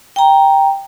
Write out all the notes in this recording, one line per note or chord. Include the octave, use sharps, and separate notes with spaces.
G5 A#5